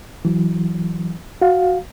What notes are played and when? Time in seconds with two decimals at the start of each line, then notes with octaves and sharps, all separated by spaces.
0.25 E3 F#3
1.42 F#4 F5